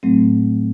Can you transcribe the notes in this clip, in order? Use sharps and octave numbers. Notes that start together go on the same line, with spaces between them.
A2 F#3 A3 C4